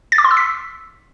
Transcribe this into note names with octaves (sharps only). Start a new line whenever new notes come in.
A6
D6
C6
E6
B6